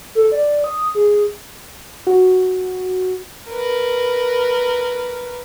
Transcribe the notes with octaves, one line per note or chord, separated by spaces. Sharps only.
A4
D5
D#6
G#4
F#4
A#4 B4